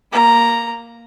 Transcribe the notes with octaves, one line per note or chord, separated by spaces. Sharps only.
A#3 A#5